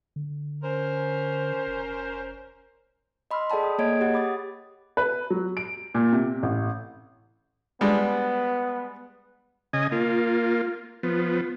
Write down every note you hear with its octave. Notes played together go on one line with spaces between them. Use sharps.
D3
C#4 A#4 C5
F1
D#5 B5 C6 E6 F6
G#4 A4 D5 G5 A5 B5
G5 D#6
A#3 G#4 C#5 D#5 G#6 D7
G4 F#5
B5 D6 D#6 A6
B4
F#3
D7
A#2
C3
A1
G3 G#3 B3 D4
C#3 D#5 G#5
A#3 F4
F3 B3